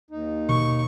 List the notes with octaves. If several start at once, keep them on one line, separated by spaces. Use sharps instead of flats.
D#2 D#4
B2 D#3 C#6